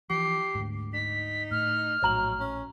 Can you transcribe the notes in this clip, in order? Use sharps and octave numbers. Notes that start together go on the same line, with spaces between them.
E3 F3 G4 C7
D2 G#2
D#4 B6
A2 F6
A#1 A2 F#3 C#5 A#5 F#7
C#4